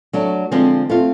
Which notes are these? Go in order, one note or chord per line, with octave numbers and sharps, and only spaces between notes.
F#3 A3 D4 F#4
D3 F3 G#3 C4
A3 C4 F4